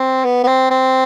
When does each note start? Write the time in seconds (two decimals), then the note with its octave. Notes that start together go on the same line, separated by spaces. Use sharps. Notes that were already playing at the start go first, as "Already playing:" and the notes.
Already playing: C4
0.25 B3
0.43 B3
0.47 C4
0.70 C4